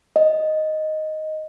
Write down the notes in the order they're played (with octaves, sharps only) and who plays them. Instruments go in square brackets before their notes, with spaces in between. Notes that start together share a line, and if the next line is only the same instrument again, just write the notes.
[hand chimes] D#5